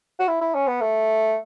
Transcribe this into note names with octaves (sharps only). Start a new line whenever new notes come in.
F#4
E4
E4
C#4
B3
A3